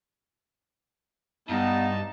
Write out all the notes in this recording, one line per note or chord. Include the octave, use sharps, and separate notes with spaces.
G2 B3 D#4 A5